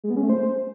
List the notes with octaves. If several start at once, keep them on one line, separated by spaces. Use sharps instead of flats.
G#3
B3
C#4
A3
C5